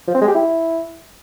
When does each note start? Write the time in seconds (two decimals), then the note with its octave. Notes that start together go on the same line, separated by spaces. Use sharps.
0.08 F3
0.15 C4
0.21 G#3
0.28 G4
0.35 E4